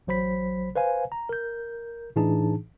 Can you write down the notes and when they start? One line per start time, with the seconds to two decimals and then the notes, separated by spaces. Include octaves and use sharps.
0.07 A1 F#3 C5 B5 B6
0.76 B4 C5 F5 G#5
1.12 A#5
1.29 A#4 G6
2.16 A2 E3 D4 D#4 G#4 A5